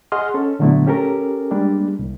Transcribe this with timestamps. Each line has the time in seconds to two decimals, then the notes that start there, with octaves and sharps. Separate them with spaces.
0.12 G#4 D#5 F#5 C6 F6
0.34 C#4 A4
0.59 A#2 D3 F#3 A3 B3 E4
0.87 C#4 G4 A4 A#4
1.51 G3 G#3 A#3 D4
1.99 C2